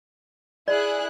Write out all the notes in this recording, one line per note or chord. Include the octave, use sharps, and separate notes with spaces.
E4 G#4 D5 F#6